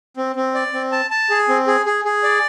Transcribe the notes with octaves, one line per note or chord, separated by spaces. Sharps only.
C4
C4
D5
C4
A5
A5
G#4
C4
G#4
G#4
G#4
D5